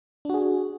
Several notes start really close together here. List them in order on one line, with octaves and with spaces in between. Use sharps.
D4 F#4 G#4